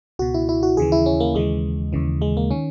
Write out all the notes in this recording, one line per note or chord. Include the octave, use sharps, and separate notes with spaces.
C#2 B2 F#4
E4
E4
F#4
D#2 C#3 E3 G#4
E4
C#4
A#3
D#2 C#3 E3 G#3
D#2 C#3 E3
G#3
A#3
D#3 C#4